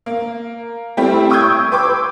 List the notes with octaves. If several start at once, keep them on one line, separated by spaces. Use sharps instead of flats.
A#3
G3 A3 C4 E4 G4
G5 C#6 D#6 E6 G6 G#6
B4 G5 C6 D6 E6